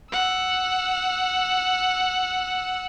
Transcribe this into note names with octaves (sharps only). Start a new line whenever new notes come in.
F#5 E6